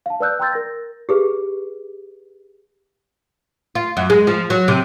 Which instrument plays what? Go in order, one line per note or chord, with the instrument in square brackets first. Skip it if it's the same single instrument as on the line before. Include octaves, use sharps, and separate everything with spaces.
[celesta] F5 A5
B4 D5 E6 F#6 G6
G5 A#5 C6 E6 G6 A6
A#4 A#6
[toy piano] G4 G#4 B4
[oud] F4
F#2
G#3
F3
F#3
C3